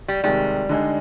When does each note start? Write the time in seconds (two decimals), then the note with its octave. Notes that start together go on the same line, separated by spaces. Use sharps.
0.08 G3
0.24 C3 D#3 G3 G#3
0.69 D3 G#3 D#4 G#4